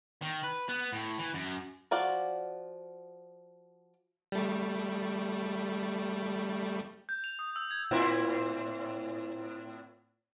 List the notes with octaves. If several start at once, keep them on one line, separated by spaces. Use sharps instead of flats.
D#3
B4
B3
A2
E3
F#2
F3 F4 F#4 D5 F5
G3 A3
G6
F7
D#6
E6
G#6
A2 C4 E4